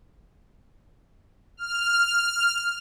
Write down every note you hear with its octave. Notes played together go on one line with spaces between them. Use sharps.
F6